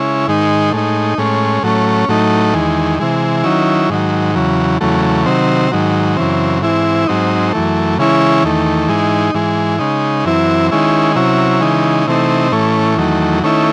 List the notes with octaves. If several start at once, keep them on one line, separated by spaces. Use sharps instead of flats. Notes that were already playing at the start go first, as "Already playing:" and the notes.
Already playing: C#3 G#3 C#4 E4
G#2 D#3 G#3 D#4
A2 G#3 D#4
A2 G#3 C#4
A2 F#3 A3 C#4
A2 F#3 A3 D#4
E2 D#3 G#3
C3 E3 G#3
D#3 F#3 C#4 E4
G#2 D#3 F#3
E2 C#3 F#3
E2 C#3 F#3 A3
C3 D#3 F#3 C4
G#2 D#3 F#3
F#2 C#3 E3 C4
G#2 E3 C4 E4
G#2 F#3 C4 D#4
F#2 E3 A3
C#3 E3 G#3 C#4 E4
E2 D#3 A3
G#2 E3 G#3 D#4
G#2 E3 G#3
C#3 G#3 D#4
F#2 E3 C4 E4
D#3 G#3 C#4 E4
C3 F#3 C#4 E4
C#3 E3 G#3 D#4
C3 E3 A3 C4 D#4
A2 E3 A3 C#4
E2 D#3 F#3 A3
D#3 A3 C#4 E4